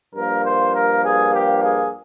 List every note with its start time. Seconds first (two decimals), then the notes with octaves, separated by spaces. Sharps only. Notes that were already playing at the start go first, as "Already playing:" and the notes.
0.15 G2 F3 A#3 A#4
0.45 C5
0.75 A#4
1.04 G#4
1.34 G4
1.63 G#4